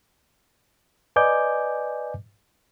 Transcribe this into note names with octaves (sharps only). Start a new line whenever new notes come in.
B4 D5 D#5 G#5 D6 G6